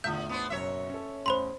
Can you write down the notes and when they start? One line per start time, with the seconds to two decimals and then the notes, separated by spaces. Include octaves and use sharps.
0.04 E2 A2 D3 F4 E5 G6
0.29 B3 D4 C5
0.50 F#1 F#2 B2 C#5 E5
0.90 C#4 A4
1.26 E2 A2 C#4 C5 B5 C6